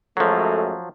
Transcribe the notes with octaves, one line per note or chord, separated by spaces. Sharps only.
F#2 F3 F#3 G#3 A3 A4